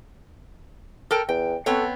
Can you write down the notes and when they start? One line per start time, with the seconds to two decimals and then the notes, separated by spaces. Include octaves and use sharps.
1.11 A4 A#4 G5
1.29 E2 G5
1.66 B3 C4 A4 C#5